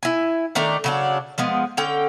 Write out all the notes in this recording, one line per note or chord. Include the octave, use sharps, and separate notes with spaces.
E4 G#5
D#3 A3 D4 A#5
C#3 F#3 D4
F3 G#3 B3
D3 C#4 G5